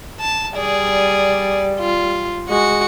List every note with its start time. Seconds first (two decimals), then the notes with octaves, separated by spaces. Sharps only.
0.20 A5
0.57 G3 G#4 D5
1.80 F4
2.49 G#3 F#4 C#7